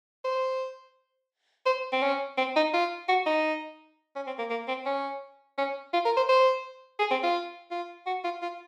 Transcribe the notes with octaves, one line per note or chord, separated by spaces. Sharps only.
C5
C5
C4
C#4
C4
D#4
F4
F#4
D#4
C#4
C4
A#3
A#3
C4
C#4
C#4
F4
A#4
C5
C5
G#4
C4
F4
F4
F#4
F4
F4